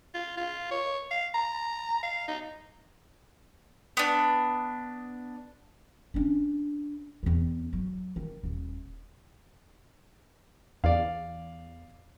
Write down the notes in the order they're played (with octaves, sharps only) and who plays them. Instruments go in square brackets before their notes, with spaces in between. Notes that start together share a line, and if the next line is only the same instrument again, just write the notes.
[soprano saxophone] F4
F4
C#5
F5
A#5
F5
D#4
[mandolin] B3 D4
[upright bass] C#4 D4
E2 C4
F#3
D#3
D#1
[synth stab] E2 [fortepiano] D5 F5